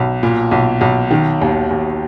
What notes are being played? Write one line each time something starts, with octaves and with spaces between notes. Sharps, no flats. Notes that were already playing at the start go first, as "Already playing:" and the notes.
Already playing: B1
A#2
B1
B1
D#3
D#2
D#2